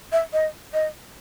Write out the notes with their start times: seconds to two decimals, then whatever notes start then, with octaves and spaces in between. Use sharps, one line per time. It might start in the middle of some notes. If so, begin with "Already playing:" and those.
0.12 E5
0.33 D#5
0.74 D#5